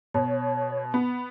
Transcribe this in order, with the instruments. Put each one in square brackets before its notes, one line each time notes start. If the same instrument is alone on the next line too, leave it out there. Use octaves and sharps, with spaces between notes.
[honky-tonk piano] B2 [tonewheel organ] C#5
[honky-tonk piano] B3